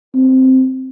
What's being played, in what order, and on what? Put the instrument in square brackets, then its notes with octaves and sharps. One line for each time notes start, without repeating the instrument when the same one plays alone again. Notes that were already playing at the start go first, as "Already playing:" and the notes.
[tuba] C4